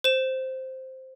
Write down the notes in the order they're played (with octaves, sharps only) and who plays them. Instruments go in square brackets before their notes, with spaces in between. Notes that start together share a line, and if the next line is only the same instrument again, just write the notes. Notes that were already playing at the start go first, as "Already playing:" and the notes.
[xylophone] C5 E7